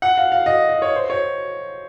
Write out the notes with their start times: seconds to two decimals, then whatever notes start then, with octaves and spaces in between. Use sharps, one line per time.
0.02 F#5
0.18 F5
0.32 F5
0.46 D#5
0.69 D#5
0.82 C#5
0.96 C5
1.10 C#5